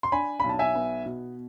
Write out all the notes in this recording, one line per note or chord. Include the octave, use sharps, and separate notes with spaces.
C6
D4 G#5 B5
B1 B5
A5
E5 G#5
B3
B2